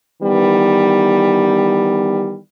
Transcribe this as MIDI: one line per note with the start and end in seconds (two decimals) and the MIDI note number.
0.22 2.37 51
0.22 2.37 52
0.22 2.37 55
0.22 2.37 59